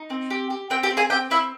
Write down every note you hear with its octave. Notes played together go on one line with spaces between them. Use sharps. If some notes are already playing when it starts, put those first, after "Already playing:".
Already playing: D#4
C4
G4
G4
C4 G4 G5
G4 G5
C4
G#4 G#5
C4 G4 G5
C4 E4 E5